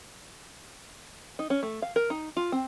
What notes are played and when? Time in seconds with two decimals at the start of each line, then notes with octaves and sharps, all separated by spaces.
1.39 D#4
1.50 C#4
1.63 A3
1.82 F5
1.96 A#4
2.10 D#4
2.37 F4
2.52 C4